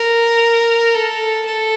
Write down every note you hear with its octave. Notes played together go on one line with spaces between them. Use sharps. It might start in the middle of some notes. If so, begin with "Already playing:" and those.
Already playing: A#4
A4
A4